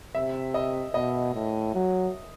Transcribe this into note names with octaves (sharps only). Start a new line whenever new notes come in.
C3 E5
D#5
B2 D#5
A2
F#3